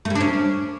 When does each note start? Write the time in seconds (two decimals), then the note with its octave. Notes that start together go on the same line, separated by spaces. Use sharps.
0.05 A3
0.10 G3
0.15 D4
0.20 C#4